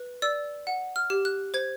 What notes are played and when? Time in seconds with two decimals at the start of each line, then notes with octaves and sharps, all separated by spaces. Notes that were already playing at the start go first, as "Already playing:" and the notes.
Already playing: B4
0.22 D5 E6
0.67 F#5
0.96 F6
1.10 G4
1.25 F#6
1.54 C5 G#6